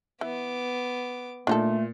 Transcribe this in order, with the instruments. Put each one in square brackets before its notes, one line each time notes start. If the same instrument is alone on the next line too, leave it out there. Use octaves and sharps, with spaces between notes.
[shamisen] E3 [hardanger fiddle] B3 D6
[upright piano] A#2 [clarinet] A3 [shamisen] D4 D#4 A4